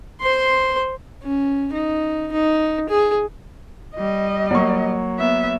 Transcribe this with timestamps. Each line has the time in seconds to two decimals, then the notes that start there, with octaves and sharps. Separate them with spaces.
0.21 C5 C6
1.23 C#4
1.73 D#4
2.32 D#4
2.89 G#4
3.95 G3 D#5
4.51 F#3 A#3 C#6
5.17 B3 E5